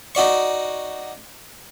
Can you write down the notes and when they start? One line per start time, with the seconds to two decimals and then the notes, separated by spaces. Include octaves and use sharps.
0.15 D#4 F#4 D5 C#6